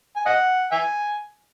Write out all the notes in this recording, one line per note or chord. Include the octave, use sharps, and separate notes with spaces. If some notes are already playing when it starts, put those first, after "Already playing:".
G#5
D#5 F#5
E5 G#5